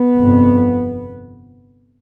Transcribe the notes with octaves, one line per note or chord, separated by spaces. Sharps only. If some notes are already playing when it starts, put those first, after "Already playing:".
Already playing: B3
G1 F2 C3